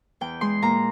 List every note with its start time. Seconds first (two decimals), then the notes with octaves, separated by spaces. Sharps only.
0.21 E2 G5
0.41 G#3 C6
0.62 A#2 A#5